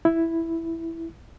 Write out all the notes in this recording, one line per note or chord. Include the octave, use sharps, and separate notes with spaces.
E4